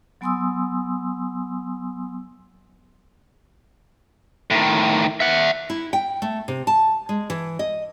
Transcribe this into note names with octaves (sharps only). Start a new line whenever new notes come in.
F#3 B3 G#5 C6 D#6 E6
A2 D#3
E5 F#5
E4
G5
A3
C3
A5
G#3
E3
D#5